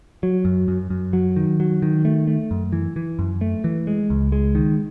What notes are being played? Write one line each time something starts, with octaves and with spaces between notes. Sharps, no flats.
F#3
F#2
F#2
F#2
F#3
D#3
F#3
D#3
A3
A3
F#2
E3
E3
F#2
A3
E3
G#3
C#2
G#3
D#3